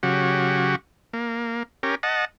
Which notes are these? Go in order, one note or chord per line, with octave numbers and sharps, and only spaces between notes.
C#3 F#3 F#4 G4
A#3
C#4 G4 A#4
D#5 F#5 A5